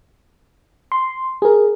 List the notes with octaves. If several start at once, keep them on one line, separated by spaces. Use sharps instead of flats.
C6
G#4 A#4